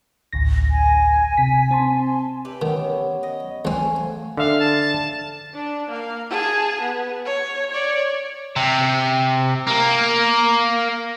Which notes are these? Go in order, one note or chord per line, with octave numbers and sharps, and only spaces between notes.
A1 D2 A#6
G#5
C3 B6
C4 A5 C6
G4 B4 E5
D#3 B3 C#4
C#5
D#5
E2 A3 C4 F5 G#5
D3 E5 F5
A5
D4
A#3 F5
G#4 A5
B3
C#5
C#5 D5
C3
A#3